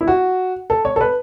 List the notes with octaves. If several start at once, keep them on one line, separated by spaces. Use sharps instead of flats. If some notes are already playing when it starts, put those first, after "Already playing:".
E4
F#4
A4
C#5
A4
B4